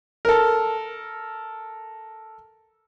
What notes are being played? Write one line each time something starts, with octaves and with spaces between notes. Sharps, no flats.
A4 A#4